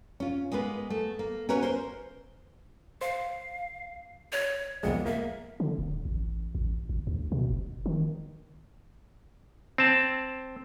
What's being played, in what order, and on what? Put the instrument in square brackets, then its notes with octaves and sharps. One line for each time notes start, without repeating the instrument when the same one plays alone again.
[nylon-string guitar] C#4 F4
G#3 A#3 B3 B4
A3
A#3
C#4 F#4 A#4 B4 C#5
A#4 C5
[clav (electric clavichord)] C5 [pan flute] F5
[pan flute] C#5
[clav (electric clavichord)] C2 F2 G#3 [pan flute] B3
[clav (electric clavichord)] A#3 [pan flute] E5
[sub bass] D3
D#1
A1
A1
G#1
D2
B2
F1
D#3
[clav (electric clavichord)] C4 A5